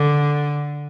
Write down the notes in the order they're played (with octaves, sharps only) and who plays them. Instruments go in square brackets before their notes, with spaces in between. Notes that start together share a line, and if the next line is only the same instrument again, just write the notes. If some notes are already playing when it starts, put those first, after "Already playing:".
Already playing: [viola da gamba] D3